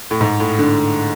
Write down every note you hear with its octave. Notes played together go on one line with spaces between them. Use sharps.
A2
G#2
A2
D3